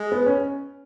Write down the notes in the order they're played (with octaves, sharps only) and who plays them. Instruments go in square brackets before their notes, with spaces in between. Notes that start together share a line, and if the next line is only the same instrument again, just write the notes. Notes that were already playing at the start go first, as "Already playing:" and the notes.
Already playing: [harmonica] G#3
[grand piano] B3
C#4